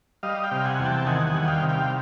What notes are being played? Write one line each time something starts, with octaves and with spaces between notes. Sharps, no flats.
G3 D#5 F5
F5 G5
C3
F#5 G#5
E2
G5 A5
D#3 F#5 G#5
F#5 G#5
G3
G#5
F5 G5
C3
F5 G5